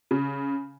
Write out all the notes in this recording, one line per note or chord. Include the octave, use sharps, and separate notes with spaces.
C#3